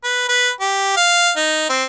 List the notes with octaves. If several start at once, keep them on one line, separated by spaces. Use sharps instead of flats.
B4
B4
G4
F5
D#4
C4